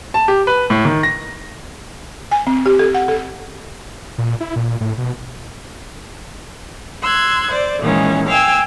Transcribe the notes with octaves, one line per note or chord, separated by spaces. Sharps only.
A5
G4
B4
A2
D#3
A#6
G#5
C4
G4
A4
F#5
A4
A#2
E4
A#2
A2
B2
C6 E6 F#6 G#6
C5 D5
A#2 D#3 E3 G#3 C#4
F5 G5 G#5 E6